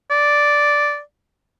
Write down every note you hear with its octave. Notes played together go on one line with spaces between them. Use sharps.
D5